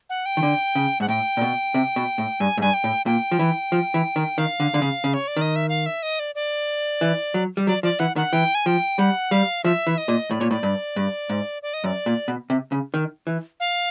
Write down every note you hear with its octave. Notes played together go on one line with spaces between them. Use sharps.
F#5
G5
D#3
D3
C#3
G#2 F#5
A2 G5
A#2
B2
C3
B2
A2
G2 G#5
G#2
G2 G#5
G5
A2
A#2 G5
F3
E3
F3
E3
D#3
D#3 F5
D3
D3
C#3
C#3
C#5
D5
D#3 D#5
E5
F5
E5
D#5
D5
D5
E3
F#3
G3
F#3 D5
F3 D5
E3 F#5
D#3 F#5
E3 G5
G#5
F3 G5
G3 F#5
G3 F5
F3 E5
E3
D#5
A#2
A2 D5
A#2 C#5
A2 D5
G2
G2
G#2
D5
D#5
F#2 D5
A#2
B2
C3
C#3
D#3
E3
F5